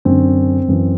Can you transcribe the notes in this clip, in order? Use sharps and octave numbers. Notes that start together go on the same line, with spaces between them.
F#2 D3 C4
F#2 E3